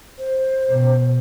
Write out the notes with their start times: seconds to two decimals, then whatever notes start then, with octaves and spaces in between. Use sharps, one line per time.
0.18 C5
0.67 B2